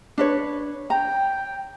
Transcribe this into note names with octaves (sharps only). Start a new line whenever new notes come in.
D4 B4 C#5
G5 A#5